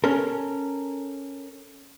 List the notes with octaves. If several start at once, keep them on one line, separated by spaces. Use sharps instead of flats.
C#4 A4 A#4